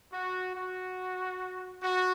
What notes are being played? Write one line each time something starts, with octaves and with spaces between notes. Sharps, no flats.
F#4
F#4
F#4